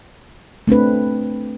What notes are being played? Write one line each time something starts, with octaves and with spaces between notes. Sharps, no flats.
A3 C4 D4 B4